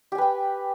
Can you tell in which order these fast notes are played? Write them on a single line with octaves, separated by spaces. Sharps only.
G4 G#5 B4 G5